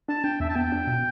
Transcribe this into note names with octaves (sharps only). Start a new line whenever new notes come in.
D4 A5
D4 G5
E2 E5
A5
B3 G5
D4
B2